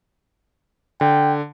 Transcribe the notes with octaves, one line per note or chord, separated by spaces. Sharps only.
D3 G5